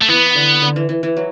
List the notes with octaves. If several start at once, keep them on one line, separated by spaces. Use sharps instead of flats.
A3
E3 B3
D3
D3
E3
E3
E3
F#3